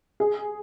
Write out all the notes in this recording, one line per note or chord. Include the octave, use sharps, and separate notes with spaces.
G#4